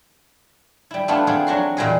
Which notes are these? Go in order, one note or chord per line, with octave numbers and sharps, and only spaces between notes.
G3 E4
A3 B3 D4 E4 F4
B3 C4 D4 F4 G#4 A4
F#3 D4 F#4 C6
E2 A#2 G3 E4 G#4 D#5